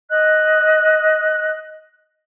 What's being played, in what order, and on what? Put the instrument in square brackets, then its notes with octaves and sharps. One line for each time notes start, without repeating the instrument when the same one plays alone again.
[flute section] D#5 F#6